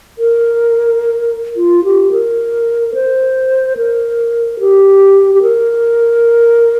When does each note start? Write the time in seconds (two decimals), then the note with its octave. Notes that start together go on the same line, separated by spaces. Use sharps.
0.18 A#4
1.56 F4
1.84 G4
2.11 A#4
2.94 C5
3.77 A#4
4.60 G4
5.35 G4
5.42 A#4